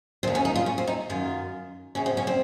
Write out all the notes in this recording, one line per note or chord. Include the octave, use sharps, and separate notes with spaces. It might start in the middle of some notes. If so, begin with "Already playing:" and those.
D#2 D#3 C4
C#4
D#4
F4
C#4
C4
D#4
F#2 D#3 F4
F#2 C#3 C#4
C4
C#4
C4